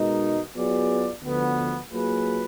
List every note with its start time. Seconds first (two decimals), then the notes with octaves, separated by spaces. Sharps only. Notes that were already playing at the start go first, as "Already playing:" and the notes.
Already playing: B2 G#3 D#4 A#4
0.56 F#3 B3 F4 G#4 D5
1.23 D2 D3 F3 B3
1.92 F#3 A#3 F4 G#4 B4